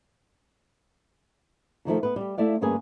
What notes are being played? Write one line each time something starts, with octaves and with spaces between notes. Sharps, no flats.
F2 D#3 F3 A3
B3 B4
G3 G4
A3 E4 D5 F5
D2 G2 A#3 C#4 G#4 B4